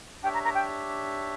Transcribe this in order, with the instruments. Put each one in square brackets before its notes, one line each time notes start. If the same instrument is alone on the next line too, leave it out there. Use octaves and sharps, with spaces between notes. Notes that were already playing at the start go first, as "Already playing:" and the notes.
[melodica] D4 G4 C#5 E5 [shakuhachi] G5
[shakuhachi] A#5
A#5
G5